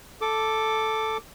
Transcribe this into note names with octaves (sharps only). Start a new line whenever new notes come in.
A4 D6